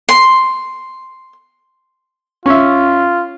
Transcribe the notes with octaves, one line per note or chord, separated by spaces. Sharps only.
C6
C#4 F4 E5